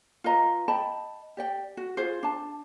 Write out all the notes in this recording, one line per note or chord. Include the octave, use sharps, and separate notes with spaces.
F4 B4 D#5 A#5
D#5 G5 A5 B5
G4 D5 G5
F#4
F4 G#4 C5
D4 A5